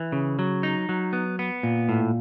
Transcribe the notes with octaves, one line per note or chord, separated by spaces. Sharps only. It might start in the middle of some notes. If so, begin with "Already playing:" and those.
Already playing: E3
C#3
F#3
D#4
F#3
B3
B3
A#2
A2